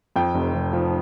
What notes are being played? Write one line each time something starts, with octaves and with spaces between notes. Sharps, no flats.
F2 G5
F1
F1
F3